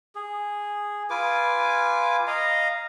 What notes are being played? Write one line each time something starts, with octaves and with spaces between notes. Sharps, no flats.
G#4
F4 B4 G#5 D6
D#5 F5 A#5